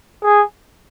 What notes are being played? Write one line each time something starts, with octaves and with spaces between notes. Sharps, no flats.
G#4